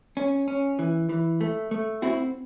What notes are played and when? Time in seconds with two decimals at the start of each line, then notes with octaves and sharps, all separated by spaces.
0.17 C#4
0.48 C#4
0.79 E3
1.09 E3
1.41 A3
1.71 A3
2.02 C4 E4 F#4